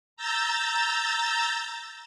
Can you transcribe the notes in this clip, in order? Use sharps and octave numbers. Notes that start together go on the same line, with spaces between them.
A#5 E6 G6 A6